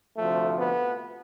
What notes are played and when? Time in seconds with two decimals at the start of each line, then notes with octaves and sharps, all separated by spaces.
0.17 D2 C3 F3 A3
0.57 B3